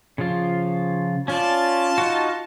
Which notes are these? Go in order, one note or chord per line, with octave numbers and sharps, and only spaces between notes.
C#3 F3 F4
C#4 F4 D5 A5
D#4 F#4